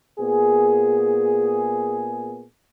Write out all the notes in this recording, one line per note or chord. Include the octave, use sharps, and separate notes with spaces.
A#2 B3 G#4